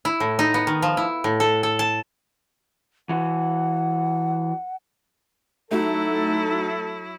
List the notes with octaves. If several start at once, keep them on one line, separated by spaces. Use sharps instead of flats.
E4
A2
D#4
B3
D#3
F3
E4
A2
A4
A4
A5
E3 F#4 F#5
F#3 A3 D#4 E4 F#4 A4